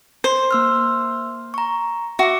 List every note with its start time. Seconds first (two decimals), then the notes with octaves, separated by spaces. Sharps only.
0.24 C5
0.51 A#3 E6 F6
1.54 A#5 C#6
2.19 F#4 E5 C#6 D6